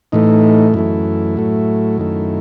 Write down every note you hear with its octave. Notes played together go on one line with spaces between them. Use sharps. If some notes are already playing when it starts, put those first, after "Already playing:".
A2 E3 A3 D#4
F#2 E3 A3 E4
A2 F#3 A3
F#2 D#3 A3